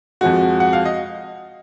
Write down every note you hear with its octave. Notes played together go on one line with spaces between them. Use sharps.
F2 F3 G#3 F#4
F#5
F5
D#5